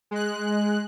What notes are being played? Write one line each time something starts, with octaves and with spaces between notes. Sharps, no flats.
G#3 F#6